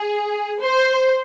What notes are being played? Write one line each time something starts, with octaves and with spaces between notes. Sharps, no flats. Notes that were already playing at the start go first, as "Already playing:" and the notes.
Already playing: G#4
C5